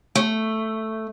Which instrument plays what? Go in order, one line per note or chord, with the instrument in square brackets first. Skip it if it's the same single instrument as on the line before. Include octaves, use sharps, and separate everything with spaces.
[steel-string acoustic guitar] A3